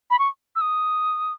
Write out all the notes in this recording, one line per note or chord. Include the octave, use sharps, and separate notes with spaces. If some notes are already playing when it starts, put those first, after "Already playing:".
B5
C#6
E6
D#6